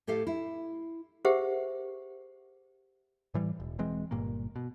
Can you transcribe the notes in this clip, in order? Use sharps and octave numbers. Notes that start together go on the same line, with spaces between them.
A2 G4 A4 F5 A5
E4
G4 G#4 A#4 C5 E5 F#5
A2 E3 G3
E1
E1 E3 G#3 C4
G1 G2 A#2 A#3
B2